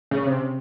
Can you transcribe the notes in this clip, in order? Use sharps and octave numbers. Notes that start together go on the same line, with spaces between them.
C#3
C3